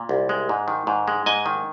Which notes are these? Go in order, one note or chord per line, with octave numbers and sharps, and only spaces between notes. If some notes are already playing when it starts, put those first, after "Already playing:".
Already playing: A#2
C2
G#3
G#2
D#3
G#2
G#3
G#2 D#5 G#5
D#3